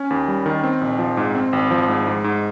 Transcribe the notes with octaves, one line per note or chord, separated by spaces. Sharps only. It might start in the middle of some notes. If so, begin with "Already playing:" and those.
Already playing: C#4
D#2
G3
D#3
C4
A#1
F3
G#2
C4
G#1
F3
G#2
G#2
G#2